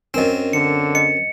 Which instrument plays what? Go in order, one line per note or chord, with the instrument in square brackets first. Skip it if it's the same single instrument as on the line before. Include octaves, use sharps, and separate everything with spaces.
[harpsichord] F#2 C4 [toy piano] D4 A#4 D#5
[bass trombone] D3 [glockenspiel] C#7
[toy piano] D#5 [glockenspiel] C#7